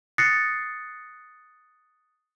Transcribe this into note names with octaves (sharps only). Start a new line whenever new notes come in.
D#6 F#6 A6 A#6 C7 C#7